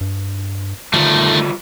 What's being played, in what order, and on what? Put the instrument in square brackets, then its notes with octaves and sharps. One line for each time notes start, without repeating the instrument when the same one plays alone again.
[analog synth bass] G2
[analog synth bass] D3 [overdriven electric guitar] D#3 A3 [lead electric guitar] F3 G3